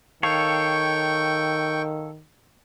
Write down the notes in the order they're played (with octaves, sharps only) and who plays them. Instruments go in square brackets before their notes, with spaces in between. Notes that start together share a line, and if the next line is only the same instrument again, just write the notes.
[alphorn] D#3 [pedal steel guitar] A4 C#5 F5 [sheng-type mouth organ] G5 C#6